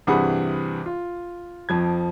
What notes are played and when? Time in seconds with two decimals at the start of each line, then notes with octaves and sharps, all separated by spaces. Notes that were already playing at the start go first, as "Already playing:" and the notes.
0.07 G2 C3 E3 G#4 F#5 B5
0.86 F4
1.69 F2 F3 G#6